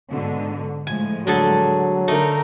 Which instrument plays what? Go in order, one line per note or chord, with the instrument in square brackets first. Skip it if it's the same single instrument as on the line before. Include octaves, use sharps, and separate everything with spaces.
[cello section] G#2 B2 D3
[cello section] A2 F3 G#3 [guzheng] G#5
[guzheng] D3 G#4 A4 [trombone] F#3
[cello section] D3 A#4 [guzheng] A3 D#4